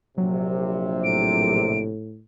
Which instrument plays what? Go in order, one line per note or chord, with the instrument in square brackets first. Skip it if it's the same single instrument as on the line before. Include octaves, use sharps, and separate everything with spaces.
[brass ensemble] A#1 C3 [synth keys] F#3
[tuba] A2 [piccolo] D7